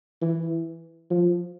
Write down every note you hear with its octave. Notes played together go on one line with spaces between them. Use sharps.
E3
F3